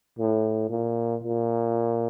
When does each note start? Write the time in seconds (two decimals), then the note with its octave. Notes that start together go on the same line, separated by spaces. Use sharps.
0.19 A2
0.70 A#2
1.23 A#2